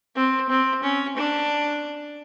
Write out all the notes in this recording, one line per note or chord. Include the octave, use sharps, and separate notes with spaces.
C4
C4
C#4
D4